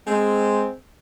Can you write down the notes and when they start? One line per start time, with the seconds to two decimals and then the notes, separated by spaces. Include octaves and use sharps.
0.05 G#3 C4